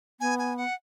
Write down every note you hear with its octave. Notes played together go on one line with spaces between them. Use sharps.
B3 G#5
G#5
F#5